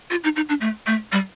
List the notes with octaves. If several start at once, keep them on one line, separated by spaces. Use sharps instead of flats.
F4
D#4
D#4
D4
A3
A3
G3